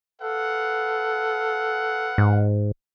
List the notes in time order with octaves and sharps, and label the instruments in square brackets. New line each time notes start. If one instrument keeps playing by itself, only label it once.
[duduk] A4 [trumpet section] B4 F5 F#5
[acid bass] G#2